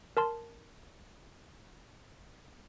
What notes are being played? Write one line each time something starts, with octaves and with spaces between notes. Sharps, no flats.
A#4 A5 C6